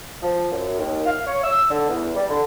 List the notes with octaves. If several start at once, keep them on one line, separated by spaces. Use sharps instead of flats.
F3
F#2
D#2
F5
C#5
E6
D3
E2
G3
D3